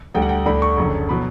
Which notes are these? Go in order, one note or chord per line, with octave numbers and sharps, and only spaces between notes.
D2 D3 G3 G5
F#5
G5
D2 D3 A3 D4 B5
C#6
F#1 F#2 D3
B2 F#3 B5